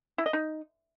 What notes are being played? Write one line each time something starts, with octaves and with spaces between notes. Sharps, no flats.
E4
D#5
D#4